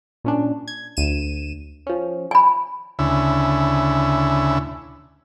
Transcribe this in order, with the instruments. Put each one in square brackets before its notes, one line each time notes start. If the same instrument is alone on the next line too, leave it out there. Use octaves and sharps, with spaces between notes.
[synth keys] A#2 C#4 D4
G#6
D2 D#7 E7
F3 C#4
[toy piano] G#5 B5
[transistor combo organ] D2 C#3 E4